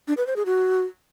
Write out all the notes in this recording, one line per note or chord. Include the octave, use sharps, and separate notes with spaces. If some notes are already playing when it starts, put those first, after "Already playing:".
D4
B4
C5
G#4
F#4